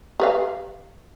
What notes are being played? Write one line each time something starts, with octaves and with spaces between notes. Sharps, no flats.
G4 B4 F5